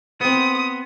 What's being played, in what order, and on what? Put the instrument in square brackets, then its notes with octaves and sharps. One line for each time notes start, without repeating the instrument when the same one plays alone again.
[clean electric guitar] B3 [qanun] C4 C5 [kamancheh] D#6